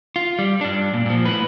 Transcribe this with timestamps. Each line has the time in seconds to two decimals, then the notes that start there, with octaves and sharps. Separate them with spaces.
0.16 F4
0.39 G3
0.61 G2 D4
0.94 A#2
1.06 A#2 F3
1.25 A2 B4